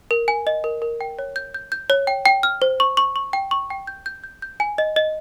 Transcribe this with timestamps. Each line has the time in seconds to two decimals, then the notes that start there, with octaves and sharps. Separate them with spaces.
0.11 A#4
0.28 G#5
0.47 D#5
0.64 A#4
0.82 A#4
1.01 G5
1.19 C#5
1.36 G6
1.54 G6
1.72 G6
1.90 C#5
2.07 G5
2.26 G5
2.43 F6
2.62 C5
2.80 C#6
2.97 C#6
3.16 C#6
3.33 G5
3.51 C#6
3.70 G5
3.87 G6
4.06 G6
4.24 G6
4.42 G6
4.60 G#5
4.78 D#5
4.96 D#5